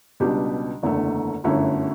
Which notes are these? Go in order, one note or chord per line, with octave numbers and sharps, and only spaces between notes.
C#2 B2 G3 D4 G4
F#1 E2 D3 A3
G1 F#2 D3 A3 E4